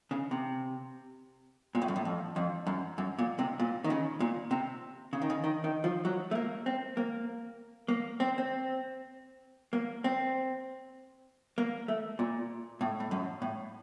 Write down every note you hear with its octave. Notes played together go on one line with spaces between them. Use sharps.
C#3
C3
A#2
A2
F#2
A2
F2
F2
F#2
F#2
A#2
C3
A#2
D#3
C#3
A#2
C3
C#3
D#3
C#3
D#3
D#3
F3
F#3
A3
A#3
C4
A#3
A#3
C4
C4
A#3
C4
A#3
A3
A#2
A2
A2
F#2
A2